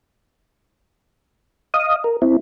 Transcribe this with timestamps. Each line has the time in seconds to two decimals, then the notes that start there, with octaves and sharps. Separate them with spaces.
1.74 D#5 F5 D#6
2.04 A#4
2.22 C4 E4